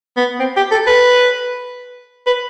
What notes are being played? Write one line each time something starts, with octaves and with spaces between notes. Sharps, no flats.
B3
C4
G4
A4
B4
B4